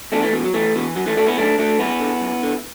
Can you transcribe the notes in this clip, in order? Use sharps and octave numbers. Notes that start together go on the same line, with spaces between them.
E2 A3 D4
E3 A3
B2 E3
F#3
E2 E3 A3
B2 E3
F#2 F#3
E3 A3
D3 A3 D4
B3 E4
F#2 A3 D4
D3 A3 D4
F#2 B3 E4
D3
F#2
D3